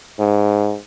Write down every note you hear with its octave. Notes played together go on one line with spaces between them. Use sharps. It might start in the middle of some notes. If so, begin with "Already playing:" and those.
G#2